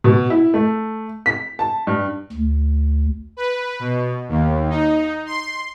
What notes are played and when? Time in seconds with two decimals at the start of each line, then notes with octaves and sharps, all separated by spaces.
0.04 B2
0.30 E4
0.54 A3
1.26 B6
1.59 A5
1.87 G2
2.32 D2
3.37 B4
3.79 B2
4.29 D#2
4.70 D#4
5.26 C6